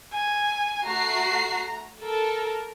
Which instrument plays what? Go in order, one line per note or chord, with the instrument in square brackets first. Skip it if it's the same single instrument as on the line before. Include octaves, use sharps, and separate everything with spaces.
[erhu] G#5
[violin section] A3 F#4 C7 [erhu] A#5
[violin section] A4 [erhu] A#4